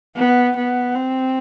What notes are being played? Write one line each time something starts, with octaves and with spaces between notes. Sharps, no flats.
B3
B3
C4